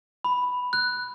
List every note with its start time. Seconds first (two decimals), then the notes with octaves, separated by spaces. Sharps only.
0.24 B5
0.73 F#6